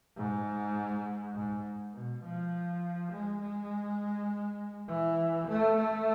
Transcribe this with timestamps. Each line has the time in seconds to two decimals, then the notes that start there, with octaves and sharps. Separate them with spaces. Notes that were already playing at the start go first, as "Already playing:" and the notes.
0.17 G#2
1.35 G#2
1.94 B2
2.24 F3
3.12 G#3
3.41 G#3
4.88 E3
5.48 A3
5.77 A3